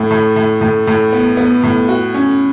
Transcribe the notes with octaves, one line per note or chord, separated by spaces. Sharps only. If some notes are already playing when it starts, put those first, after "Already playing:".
Already playing: A2
A2
A2
A2
A2
B3
B3
A2
F#4
C#4